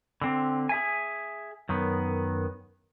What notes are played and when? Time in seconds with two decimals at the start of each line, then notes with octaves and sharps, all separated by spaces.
0.22 D3 C4
0.69 G#4 E5 G#5
1.69 F#2 D#3 B3